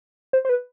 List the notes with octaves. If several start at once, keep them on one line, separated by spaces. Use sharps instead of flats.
C5
C5
B4